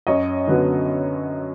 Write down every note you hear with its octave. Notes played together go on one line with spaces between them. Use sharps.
F#2 C#5 D#5
D3 F#3 B3